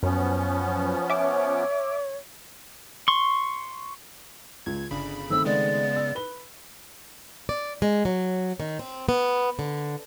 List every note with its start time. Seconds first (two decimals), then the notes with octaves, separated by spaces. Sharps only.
0.03 F#2 F3 B3 C#4
1.10 C#5 E5 D6
3.08 C6 C#6
4.66 C#2 G#6
4.91 G1 C#3 D4 B5
5.30 D#3 A3 C4 E6
5.45 C#3 G#3 B3 D5
5.96 E6
6.15 B4 G7
7.49 D5
7.82 G#3
8.05 F#3
8.60 D#3
8.79 C4
9.09 B3
9.59 D3